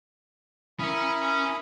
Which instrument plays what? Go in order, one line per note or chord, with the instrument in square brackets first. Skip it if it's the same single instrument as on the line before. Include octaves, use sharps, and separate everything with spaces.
[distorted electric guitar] C#4 G#5 [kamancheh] E4 A#4 [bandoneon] B5 D#6